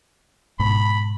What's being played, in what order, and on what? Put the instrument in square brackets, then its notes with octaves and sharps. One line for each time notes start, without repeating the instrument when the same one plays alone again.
[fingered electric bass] G#2 B2 [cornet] B5